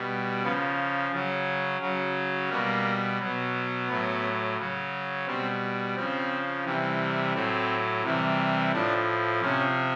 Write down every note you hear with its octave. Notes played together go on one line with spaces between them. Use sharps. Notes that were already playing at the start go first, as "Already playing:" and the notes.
Already playing: B2 G3
C#3 F3 B3
C#3 F#3
C#3 F#3
B2 G3 A#3
B2 F#3
A2 F#3 B3
C#3 F#3
B2 G3 C4
C#3 F3 C4
C3 E3 G3
A2 F#3 C4
C3 E3 G3
A2 F3 D4
C3 F3 C#4